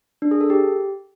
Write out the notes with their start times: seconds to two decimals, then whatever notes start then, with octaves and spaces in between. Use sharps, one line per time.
0.22 D4
0.31 G#4
0.41 A4
0.50 G4